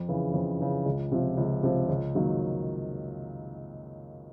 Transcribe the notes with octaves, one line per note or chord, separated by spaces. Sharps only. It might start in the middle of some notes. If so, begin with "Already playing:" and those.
Already playing: F2
C#3 E3
F2
C#3 E3
C#2
C3 F3
C#2
C3 F3
C#2
D#3 F#3 A#3